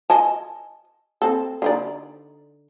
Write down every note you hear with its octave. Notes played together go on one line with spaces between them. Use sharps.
D#5 G#5 A5
C4 A4
D3 D#4 D5